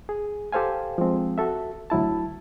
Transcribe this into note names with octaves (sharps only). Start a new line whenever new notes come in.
G#4
G4 A4 C5 F5 G#5
F3 G#3 C4
F#4 A4 E5
D2 F#3 E4 A5